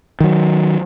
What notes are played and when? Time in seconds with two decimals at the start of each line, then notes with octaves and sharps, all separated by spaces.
0.20 D#3 F#3